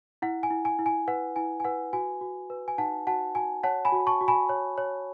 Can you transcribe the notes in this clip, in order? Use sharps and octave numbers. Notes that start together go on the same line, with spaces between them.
E4 F#5
G#5
E4
G#5
E4
G#5
B4 F#5
E4 G#5
G#5
B4 F#5
F#4 G#5
F#4
B4
G#5
D#4 F#5 A5
F#4 F#5 A5
F#4 G#5
C#5 F#5 A5
G#5 B5
F#4
A5 C#6
F#4
G#5 B5
C#5
C#5